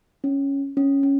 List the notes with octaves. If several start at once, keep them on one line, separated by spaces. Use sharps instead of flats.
C#4
C#4
C#4